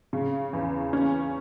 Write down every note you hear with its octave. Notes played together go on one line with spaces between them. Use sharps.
C#3
E2
C#4